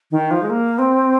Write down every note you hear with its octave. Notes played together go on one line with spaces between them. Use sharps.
D#3
F3
G#3
A#3
C4